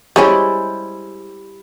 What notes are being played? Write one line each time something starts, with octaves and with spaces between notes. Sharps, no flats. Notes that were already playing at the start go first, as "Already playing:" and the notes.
G3 G#3 C#4 E4 C5